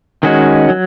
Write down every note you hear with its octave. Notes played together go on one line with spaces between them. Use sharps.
D#3 G#3 C#4 F#4
F#3